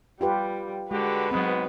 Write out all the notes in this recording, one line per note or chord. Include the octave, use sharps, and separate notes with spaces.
G3 F4 G4 B4
D3 G#3 F#4 G4 B4
G#2 F#3 B3 C4